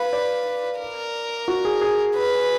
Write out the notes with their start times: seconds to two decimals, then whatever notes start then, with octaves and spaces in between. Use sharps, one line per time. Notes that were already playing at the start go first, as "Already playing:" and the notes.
Already playing: B4 F5
0.13 D5
0.80 A#4
1.48 F#4
1.65 G#4
1.81 G#4
2.16 B4